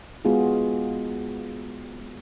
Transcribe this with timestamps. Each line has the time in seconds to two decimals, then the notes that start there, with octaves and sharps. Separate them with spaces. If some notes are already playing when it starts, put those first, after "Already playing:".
0.25 G#3 B3 F4 F#4 G#4